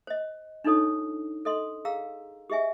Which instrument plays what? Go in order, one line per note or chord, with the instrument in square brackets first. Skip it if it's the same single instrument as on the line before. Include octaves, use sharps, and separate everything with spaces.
[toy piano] C5 D#5
D4 D#4 F4 A4 C#5 D#6
A4 D#5 C6
G#4 F5 A#5 E6
G4 G#4 D#5 E5 G#5